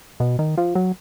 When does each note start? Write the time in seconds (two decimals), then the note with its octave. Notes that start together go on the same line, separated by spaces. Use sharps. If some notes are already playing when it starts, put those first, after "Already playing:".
0.20 B2
0.39 D#3
0.57 F3
0.75 F#3